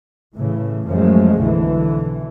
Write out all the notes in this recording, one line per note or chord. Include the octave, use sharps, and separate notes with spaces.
A2 C#3 E3
F#2 F3 G#3 A3
B1 D3 E3